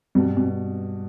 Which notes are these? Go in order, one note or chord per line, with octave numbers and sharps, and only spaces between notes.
G2 B2
B2